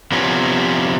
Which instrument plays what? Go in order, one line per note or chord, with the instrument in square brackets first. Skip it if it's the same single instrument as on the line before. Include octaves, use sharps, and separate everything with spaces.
[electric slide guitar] C3 F3 B3 C#4